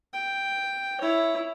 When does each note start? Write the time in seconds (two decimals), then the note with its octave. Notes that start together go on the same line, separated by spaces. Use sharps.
0.13 G5
1.01 E4 C#5